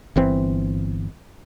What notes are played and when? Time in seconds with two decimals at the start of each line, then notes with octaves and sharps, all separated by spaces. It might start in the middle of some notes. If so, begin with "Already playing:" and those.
0.16 G1 E3 C4